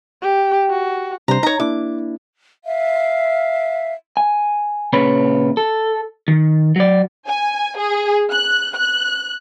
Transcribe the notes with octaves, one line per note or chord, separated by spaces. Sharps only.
G4
F#4
C3 G3 D4 C5 A#5
D#4 C#5 A#5
A#3 D4 E4 D6
E5 F5
G#5
A#2 C#3 B4 C#5 B5
A4
D#3
F#3 D5
G#5
G#4
F#6
F#6